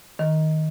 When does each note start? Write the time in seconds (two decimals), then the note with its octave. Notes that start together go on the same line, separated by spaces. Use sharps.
0.19 D#3